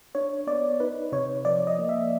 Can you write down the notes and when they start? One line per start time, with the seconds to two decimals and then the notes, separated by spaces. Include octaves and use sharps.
0.15 D4 C#5
0.47 B3 D5
0.80 D#4 B4
1.12 C3 C#5
1.45 F3 D5
1.67 D#5
1.79 A#3
1.89 E5